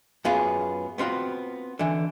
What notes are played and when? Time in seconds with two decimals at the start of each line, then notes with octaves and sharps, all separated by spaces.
0.25 F#2 B3 F4 G#4
0.98 B3 C4 F4 F#4
1.79 D3 E3